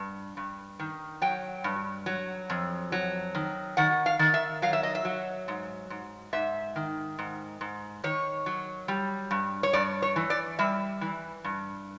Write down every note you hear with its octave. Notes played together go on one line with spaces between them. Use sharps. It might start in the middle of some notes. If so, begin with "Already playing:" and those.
Already playing: G2
G2
D#3
F#3 G5
G2
F#3
F2
F#3
D#3
D#3 F#5
F5
D#3
E5
F#3 F5
E5
D#5
E5
F#3
G#2
G#2
G#2 E5
D#3
G#2
G#2
D#3 C#5
F#3
G3
G2
C#5
G2 D5
C#5
E3
D5
G3 E5
E3
G2